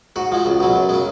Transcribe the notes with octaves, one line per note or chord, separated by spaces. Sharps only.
G#2 F#4
F3 G#3
C#2
B2 F#3
F#2
C#3 G#3